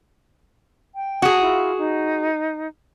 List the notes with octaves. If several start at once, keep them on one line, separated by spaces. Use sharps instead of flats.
G5
F#4 G#4
E4 F4
D#4